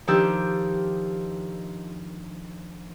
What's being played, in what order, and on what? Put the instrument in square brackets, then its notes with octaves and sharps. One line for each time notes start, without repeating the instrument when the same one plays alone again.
[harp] D#3 F3 D4 D#4 G4 E6